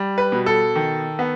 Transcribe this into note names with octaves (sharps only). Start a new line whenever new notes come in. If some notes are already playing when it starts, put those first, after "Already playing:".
Already playing: G3
B4
B2
A4
D#3
B3